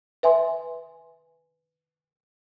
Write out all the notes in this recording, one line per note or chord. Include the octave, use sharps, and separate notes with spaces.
B4 E5 G#5 C6